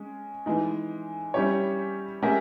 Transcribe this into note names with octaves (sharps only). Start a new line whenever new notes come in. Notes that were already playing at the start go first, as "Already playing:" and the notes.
Already playing: G#3 C#4 G#4
E3 G#3 D#4
G3 C#4 E4 G4 C#5
G#3 C#4 G4 A#4 E5